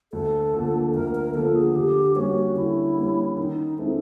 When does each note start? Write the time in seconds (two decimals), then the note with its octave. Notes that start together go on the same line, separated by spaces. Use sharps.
0.12 D2 A4
0.54 D3 F3 A#3
0.94 D2 A#4
1.15 A#4
1.34 D3 F3 A#3 A4
1.55 G#4
1.75 D3 G4
2.15 G3 A#3 C#4 F#4
2.56 D3 E4
2.97 G3 A#3 C#4
3.37 D#3 D#4
3.78 G#3 C4 D4 E4 A4